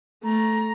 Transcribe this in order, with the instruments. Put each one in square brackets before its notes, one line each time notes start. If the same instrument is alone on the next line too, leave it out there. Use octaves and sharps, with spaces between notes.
[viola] A3 [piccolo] A#5